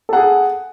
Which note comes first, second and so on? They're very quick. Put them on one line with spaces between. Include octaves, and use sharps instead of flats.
A4 F#5 G#4